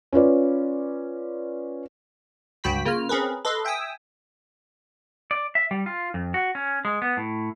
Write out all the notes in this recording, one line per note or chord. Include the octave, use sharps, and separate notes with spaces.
C#4 F4 B4 D5
C#2 G2 F#4 G5 B5 B6
C#3 A#3 F4 F6
C4 C#4 G#4 A#4 B4
A4 B4 D#5 C6
E5 G5 G#5 D#6 E6
D5
E5
G3
F4
F2
F#4
C#4
G#3
B3
A2